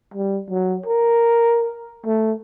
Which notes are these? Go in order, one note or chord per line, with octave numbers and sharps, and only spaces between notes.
G3
F#3
A#4
A3